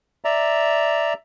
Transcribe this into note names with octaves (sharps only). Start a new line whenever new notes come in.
D5 E5 A#5